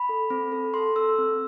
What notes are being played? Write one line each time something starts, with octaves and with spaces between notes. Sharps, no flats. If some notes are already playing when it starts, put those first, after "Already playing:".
Already playing: B5
A4
C4
A4
A4 C6
A4 E6
C4